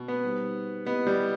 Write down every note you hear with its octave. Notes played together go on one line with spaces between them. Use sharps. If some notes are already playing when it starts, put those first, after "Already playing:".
Already playing: B2
B3
G3 D#4 G4 C5
B3 E4 G4 D#5
G3